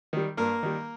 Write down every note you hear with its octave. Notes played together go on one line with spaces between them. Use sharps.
D#3 G3
G2 A#3 A#4
D#3 G3